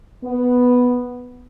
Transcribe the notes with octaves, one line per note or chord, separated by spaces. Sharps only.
B3